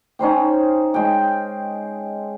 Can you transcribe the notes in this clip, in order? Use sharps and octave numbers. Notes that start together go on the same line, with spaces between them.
C#4 D#4 C5 G5
G#3 G5